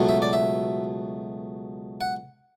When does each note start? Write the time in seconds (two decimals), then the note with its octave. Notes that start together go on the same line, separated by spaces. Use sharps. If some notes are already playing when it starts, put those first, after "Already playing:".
Already playing: C#2 B2 F#3 A3
0.09 E5
0.22 D5
0.33 E5
2.01 F#5